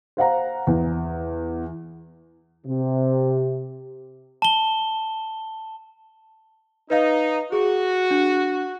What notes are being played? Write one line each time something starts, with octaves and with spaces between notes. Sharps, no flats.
C5 F5 F#5 A#5
E2
C3
A5 G7
D#4 B4 D#5 F5
F#4 G#4
D4